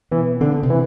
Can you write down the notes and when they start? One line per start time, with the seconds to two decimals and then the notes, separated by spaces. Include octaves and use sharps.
0.11 B2 E3 B3
0.41 D3 C4
0.52 B3
0.63 C3 C4
0.70 E3